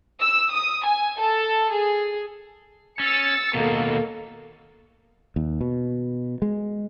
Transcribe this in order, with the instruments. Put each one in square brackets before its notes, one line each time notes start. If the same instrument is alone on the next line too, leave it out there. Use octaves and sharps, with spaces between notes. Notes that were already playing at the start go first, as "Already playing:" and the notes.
[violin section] E6
D#6
G#5
A4
G#4
[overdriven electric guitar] C#4 [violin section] E6 A6 C#7
[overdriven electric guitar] D#2 B2 [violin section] A#3 A4
[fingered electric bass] D#2
B2
G#3